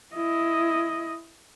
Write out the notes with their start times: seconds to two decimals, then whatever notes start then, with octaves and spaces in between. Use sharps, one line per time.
0.15 E4 D#5